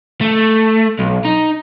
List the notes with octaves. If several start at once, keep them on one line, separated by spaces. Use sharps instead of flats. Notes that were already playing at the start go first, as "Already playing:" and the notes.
A3
B1
D#4